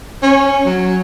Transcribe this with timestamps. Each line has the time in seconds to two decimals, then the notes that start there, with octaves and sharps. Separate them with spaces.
0.23 C#4
0.66 F#3